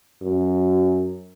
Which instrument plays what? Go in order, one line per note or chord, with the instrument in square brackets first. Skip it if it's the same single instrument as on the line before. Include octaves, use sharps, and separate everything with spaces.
[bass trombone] F#2